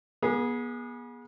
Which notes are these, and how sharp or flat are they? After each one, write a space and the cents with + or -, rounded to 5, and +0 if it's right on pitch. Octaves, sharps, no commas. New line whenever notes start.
B3 -35 G#4 +0